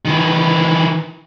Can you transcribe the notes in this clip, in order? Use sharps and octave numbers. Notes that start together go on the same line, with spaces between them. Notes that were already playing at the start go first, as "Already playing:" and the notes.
D#3 E3